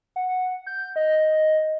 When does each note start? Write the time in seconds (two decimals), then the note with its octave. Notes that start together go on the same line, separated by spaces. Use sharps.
0.16 F#5
0.67 G6
0.96 D#5